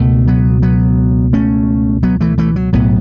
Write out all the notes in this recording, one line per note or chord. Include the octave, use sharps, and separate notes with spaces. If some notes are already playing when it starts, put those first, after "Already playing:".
Already playing: C#2 B2 A3
F#3 B3
F#3 B3
A3 C#4
F#3 B3
E3 A3
E3 A3
F#3
B1 A2 F#3 B3